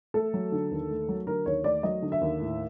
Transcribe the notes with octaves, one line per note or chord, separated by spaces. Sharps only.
A3 A4
F#3
D3
D#2
A3
F#3
D3 A#4
D#2 C#5
A3 D5
F#3 D#5
D3
E5
D#2
A2